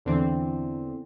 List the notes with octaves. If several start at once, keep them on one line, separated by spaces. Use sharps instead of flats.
E2 D3 E3 C4